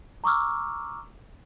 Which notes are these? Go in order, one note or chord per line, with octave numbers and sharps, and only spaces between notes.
A#5 C#6 D6 E6 F6